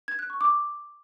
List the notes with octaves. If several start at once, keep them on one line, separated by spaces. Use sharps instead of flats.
G#6
F#6
C#6
D6